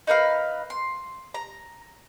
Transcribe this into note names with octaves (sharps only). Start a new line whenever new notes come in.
D#4 A#4 B4 F5
C6
A#5